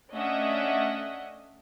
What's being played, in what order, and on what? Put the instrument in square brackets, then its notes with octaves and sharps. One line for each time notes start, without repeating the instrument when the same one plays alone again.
[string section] A3 C#4 D4 D#5 E5 F#5